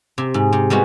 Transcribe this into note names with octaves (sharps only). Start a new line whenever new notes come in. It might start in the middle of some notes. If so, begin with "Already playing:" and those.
C3
G#2
C3
G3 G#3 B3 F#4